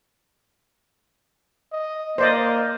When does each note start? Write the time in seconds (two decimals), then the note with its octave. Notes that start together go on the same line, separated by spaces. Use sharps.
1.73 D#5
2.18 A#3 C5 D5 D#5